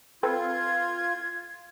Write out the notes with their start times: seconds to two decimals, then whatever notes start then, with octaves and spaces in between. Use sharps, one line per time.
0.23 C4 F4 A4 B4 G#6